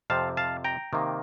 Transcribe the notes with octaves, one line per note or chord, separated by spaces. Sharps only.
F2 C3 F3 C4 F5 A5
F5 A5
G5 A#5
C3 D#3 A#3